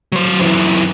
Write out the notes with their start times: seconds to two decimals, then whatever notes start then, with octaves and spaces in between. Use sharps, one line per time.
0.12 F#3 C5
0.39 F#2 E3